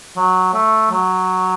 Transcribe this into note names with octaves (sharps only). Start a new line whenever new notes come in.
F#3
A3
F#3